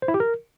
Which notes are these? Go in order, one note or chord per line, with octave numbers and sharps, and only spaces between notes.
C5
E4
G4
A#4